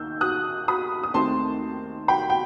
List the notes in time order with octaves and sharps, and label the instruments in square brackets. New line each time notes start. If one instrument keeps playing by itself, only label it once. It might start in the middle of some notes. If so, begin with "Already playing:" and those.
Already playing: [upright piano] D#2 D#3 E6 G6
D#6 F#6
B5 D#6
D#6
D#2 D#3 A3 C4 A5 C6
G5 B5
G5